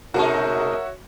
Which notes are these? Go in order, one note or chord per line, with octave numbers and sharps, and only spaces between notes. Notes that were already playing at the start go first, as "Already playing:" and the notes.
B2 G#3 D#4 F#4 A#4 C#5 E5